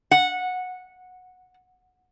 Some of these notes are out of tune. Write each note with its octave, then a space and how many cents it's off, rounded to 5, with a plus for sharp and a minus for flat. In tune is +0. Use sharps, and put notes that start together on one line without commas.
F#5 -15